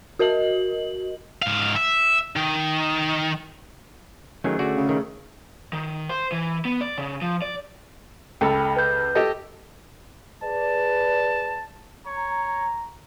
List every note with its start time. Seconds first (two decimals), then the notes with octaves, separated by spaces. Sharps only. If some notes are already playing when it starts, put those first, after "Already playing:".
0.19 F#4 A#4 D#5 F#7
1.42 G#2 F5
1.76 E5
2.36 D#3
4.44 D#3 F#3 A3 C#4 G#4
4.59 D3 F#4 D5
4.77 C#3
4.89 D#3
5.73 D#3
6.09 C5
6.32 E3
6.65 B3
6.81 D5
6.98 C#3
7.22 F3
7.42 D5
8.41 C#2 A4 G5 B5
8.76 B4 G6
9.15 G4 A4 D#5
10.43 G#4 B4 D5 A5
12.07 C#5 A#5